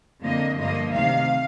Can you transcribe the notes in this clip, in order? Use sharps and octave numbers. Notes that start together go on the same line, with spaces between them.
F2 D3 F3 A#3 D#5
G2 D3 F3 A#3 D#5
D2 C3 D#3 F5